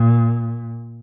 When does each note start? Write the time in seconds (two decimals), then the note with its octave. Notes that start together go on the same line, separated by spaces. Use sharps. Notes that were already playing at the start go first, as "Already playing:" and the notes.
Already playing: A#2